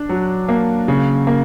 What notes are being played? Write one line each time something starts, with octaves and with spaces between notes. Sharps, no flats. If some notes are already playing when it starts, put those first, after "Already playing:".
Already playing: D4
F#3
A#3
C#3
A#3